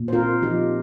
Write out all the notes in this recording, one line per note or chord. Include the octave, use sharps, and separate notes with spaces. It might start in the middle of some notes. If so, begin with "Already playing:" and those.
Already playing: A#2
C5
C4 F4 A#4
F3 D#4 G4